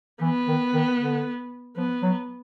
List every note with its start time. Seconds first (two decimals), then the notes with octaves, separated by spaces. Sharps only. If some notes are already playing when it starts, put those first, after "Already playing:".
0.21 E3 B3
0.48 D#3
0.74 D#3
0.99 D3
1.77 F3 B3
2.02 F#3